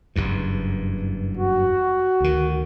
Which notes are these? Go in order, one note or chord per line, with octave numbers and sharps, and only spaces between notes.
F#1 E2 G2
F#4
D2 D#3